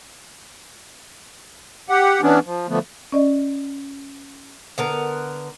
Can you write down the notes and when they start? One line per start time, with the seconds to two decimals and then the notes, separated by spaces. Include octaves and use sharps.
1.89 G4 F#5
2.22 E3 B3 C#4 D4
2.45 F3
2.69 D3 F3 A3 B3
3.12 C#4 D5 D#5
4.78 D3 B3 A#4